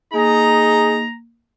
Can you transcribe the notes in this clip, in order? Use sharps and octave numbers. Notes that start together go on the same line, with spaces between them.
A#3 D#4 G#4 A#5